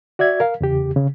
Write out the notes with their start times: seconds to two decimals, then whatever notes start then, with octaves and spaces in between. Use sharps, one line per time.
0.19 F#4 D5 E5 G#6
0.40 A#4 F5
0.61 E2 C#3 G4
0.96 C#3